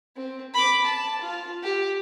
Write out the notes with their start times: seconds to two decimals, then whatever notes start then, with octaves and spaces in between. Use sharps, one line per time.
0.16 C4
0.54 B5 D6
0.84 A5
1.21 F4
1.63 G4